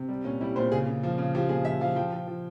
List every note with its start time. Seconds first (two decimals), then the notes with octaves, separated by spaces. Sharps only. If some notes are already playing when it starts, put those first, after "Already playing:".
Already playing: C3
0.09 G3
0.24 A#2 C#4
0.41 G3 E4
0.56 A#2 C5
0.72 C#3 G#4
0.87 C#3
1.03 F3
1.18 C#3
1.35 F3 G4
1.49 A#2 G#4
1.65 F3 E5
1.81 F3 F5
1.96 F3 G5
2.13 F3
2.28 F3